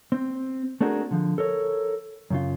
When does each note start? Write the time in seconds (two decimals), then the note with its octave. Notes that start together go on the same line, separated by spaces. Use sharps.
0.12 C4
0.81 A3 C4 D4 F#4 G#4 A#4
1.11 D3 F3
1.38 A4 A#4 C#5
2.31 F#2 C#3 F4